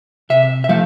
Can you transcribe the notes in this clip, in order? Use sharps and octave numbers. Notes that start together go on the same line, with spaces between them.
C3 E5
E5
F3 A3 F5